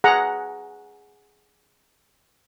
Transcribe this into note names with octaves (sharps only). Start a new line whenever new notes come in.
G#4 F#5 A#5